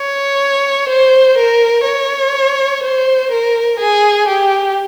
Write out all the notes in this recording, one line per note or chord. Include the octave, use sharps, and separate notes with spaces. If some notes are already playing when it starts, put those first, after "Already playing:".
Already playing: C#5
C5
A#4
C#5
C5
A#4
G#4
G4